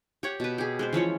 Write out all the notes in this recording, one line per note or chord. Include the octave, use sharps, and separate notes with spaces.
G4 C#5 F#5
B2 B4
G4 G#4
G#3 B4 C5
E3 F3 C#4 C#5